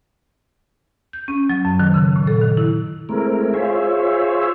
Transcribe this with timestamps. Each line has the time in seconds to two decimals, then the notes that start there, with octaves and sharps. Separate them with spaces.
1.13 G6
1.28 C#4
1.49 F#3
1.65 F#2
1.80 D#3
1.94 C#3
2.16 A#2
2.27 A4
2.41 D#3
2.57 E4
3.09 G#3 A3 C4 E4 A#4
3.54 F4 G#4 C5 C#5 E5